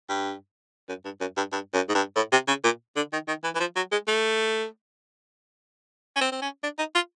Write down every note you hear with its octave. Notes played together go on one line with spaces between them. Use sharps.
G2
F#2
G2
F#2
G2
G2
F#2
G#2
G2
A2
C3
C#3
A#2
D3
D#3
D#3
E3
E3
F3
F#3
G#3
A3
C#4
C4
C4
C#4
D4
D#4
F4